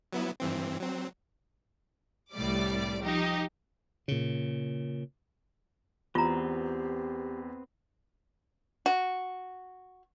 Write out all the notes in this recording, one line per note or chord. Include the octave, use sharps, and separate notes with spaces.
F#3 B3 E4
G2 E3 C4
F#3 C4
C2 A2 G3 D5 D6
F3 D#4 G4
A#2 C#3
E2 B3 C4 F4 G4 A#5
F#4